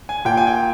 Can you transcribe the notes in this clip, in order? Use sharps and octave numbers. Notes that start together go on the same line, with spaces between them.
G#5
A#2 G5
G#5
G5